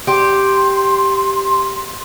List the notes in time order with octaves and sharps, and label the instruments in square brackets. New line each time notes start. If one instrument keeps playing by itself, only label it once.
[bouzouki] G4 [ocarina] C6